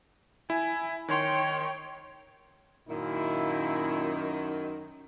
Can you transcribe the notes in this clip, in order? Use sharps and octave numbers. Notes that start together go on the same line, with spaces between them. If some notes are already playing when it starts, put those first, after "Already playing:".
E4 G#5
D#3 C#5 G5 C6
F#2 A#2 D#3 E4